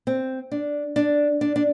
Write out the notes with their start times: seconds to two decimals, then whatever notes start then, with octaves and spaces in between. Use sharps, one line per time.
0.07 C4
0.52 D4
0.96 D4
1.41 D4
1.56 D4